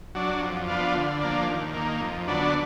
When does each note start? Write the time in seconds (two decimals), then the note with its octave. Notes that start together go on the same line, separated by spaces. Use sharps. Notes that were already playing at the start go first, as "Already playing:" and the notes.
0.15 F#3 D4
0.41 F2
0.68 F3 B3 D4 F4
0.95 D3
1.21 F3 A#3 D4
1.48 D#2
1.74 D#3 A#3
2.01 F2
2.28 D3 F#3 B3 D4